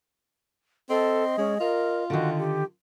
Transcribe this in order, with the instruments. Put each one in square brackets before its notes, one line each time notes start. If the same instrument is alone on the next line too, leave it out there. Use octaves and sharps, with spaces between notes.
[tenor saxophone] C4 [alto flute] A4 [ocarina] D#5
[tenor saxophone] G#3 [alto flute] C#4
[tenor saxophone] F4 [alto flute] A#4
[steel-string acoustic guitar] D3 D#3 [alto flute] F#4
[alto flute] G4